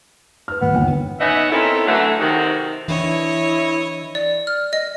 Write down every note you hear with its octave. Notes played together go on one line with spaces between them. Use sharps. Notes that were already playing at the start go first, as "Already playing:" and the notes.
B4 F6
D#1 B3
G1 D#2 G5
B3 C#4 D#4 D#5 E5 F#5
B3 C4 E4 A4 A#4 C#5
D3 E3 F#3 A3
C3 D#3 F#4
E3 D4 E4 C#5 D#5
D5
F6
D#5